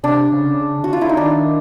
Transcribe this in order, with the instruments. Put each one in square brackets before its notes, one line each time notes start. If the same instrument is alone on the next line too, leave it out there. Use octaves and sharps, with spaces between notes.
[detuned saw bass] C3 [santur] D4
[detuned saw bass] C#3
C#3
[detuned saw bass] D3 [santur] F#4
[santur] F4
[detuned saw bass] D3 [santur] E4
[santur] D#4
[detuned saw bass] D#3 [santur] D4